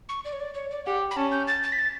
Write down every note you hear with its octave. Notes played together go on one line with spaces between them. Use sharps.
C#6
D5
C#5
D5
C#5
D5
G4 F#5
B5
C#4 A5
G6
A6
A6
B6
A6